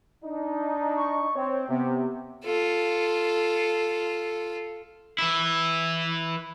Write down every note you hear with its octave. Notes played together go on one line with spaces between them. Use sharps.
D4 D#4
C#6
C4 C#5
C3 B3
F4 A4
E3 E4